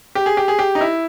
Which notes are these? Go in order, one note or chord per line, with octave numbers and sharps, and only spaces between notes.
G4
G#4
G4
G#4
G4
D#4
E4